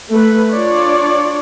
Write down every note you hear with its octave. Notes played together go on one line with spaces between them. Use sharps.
A3 B4
D4 F4 C#5 D5